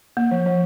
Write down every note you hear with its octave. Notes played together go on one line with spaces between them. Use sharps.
A#3
F3
F3